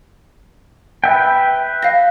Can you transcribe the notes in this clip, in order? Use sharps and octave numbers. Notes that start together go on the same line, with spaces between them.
B4 E5 G5
F5 A#6